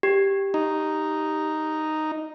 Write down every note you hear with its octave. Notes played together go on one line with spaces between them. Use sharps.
G4
D#4